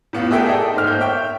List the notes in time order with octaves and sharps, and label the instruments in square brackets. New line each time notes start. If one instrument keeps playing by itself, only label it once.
[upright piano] A2 B3 F4
A3 G#4 A#4 E5 G5
G#4 A4 D5 D#5 G5
G#2 C5 F6
A#3 G6
C#5 E5 G5